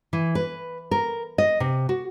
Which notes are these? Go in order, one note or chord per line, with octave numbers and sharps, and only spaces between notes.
E3
B4
A#4
D#5
C3
F#4